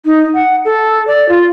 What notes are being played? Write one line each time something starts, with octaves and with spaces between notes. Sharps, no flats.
D#4
F#5
A4
D5
F4